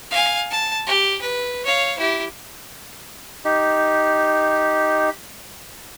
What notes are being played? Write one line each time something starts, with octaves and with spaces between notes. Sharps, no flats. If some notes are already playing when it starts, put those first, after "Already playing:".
F5 G#5
A5
G4
B4
C#5 F5
E4 G4
D#4 G4